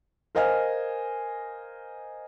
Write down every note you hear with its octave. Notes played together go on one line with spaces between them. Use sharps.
A#4 C5 D#5 F5 G#5 F6